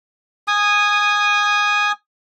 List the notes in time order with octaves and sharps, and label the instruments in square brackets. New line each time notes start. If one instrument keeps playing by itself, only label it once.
[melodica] G#5 D#6